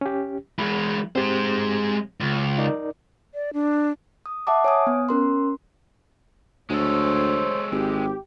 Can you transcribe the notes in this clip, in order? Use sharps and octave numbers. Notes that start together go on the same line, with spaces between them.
C#4 G4
E3 G#3 B5
G#3 C4 G4 C5
C#2
D#4 A#4 D5
D5
D4
D#6
E5 F#5 A5 D6
C#5 G#5 D#6
B3
C#4 A#4 C6
D2 G#3 A4 C5 C#5
G#1 G4